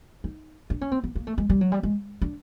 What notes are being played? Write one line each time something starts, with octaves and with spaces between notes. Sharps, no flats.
D#4
D4
C#4
C4
B3
A#3
A3
G#3
G3
F#3
G3
G#3
D4